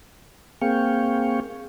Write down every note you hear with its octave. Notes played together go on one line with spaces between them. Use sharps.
A#3 C4 G#4 F5 G5 C#6